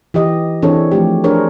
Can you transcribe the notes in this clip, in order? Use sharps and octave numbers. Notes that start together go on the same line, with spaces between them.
E3 G4 D#5
E3 C4 D4 G#4 A4 C#5
F3 A3 G4
D4 G#4 A#4 C5 C#5